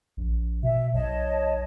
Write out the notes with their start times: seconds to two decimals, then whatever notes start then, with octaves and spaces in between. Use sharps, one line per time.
0.17 A#1
0.63 B2 E5
0.94 B1 C#5 D#5 A5